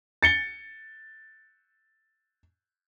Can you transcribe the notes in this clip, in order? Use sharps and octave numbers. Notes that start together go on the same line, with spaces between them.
A6 C#7 G7